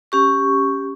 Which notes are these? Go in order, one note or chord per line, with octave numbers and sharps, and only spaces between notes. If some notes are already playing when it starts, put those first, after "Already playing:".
C#4 G4 C#6